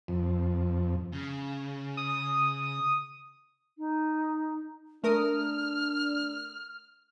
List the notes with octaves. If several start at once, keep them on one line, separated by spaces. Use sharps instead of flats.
F2
C#3
D#6
D#4
A3 D4 A#4 D#6 F6